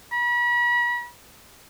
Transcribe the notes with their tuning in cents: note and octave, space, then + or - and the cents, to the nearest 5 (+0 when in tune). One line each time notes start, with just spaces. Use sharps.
B5 -40